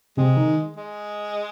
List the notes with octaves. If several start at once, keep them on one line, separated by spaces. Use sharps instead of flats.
C3 G#3 C4
D#3 D#4
G#3